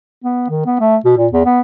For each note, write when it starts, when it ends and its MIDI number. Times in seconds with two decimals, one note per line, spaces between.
0.24 0.48 59
0.49 0.63 51
0.66 0.77 59
0.80 0.96 57
1.05 1.13 47
1.17 1.27 46
1.32 1.44 40
1.45 1.61 59